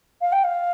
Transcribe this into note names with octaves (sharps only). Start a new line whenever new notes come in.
F5
G5
F5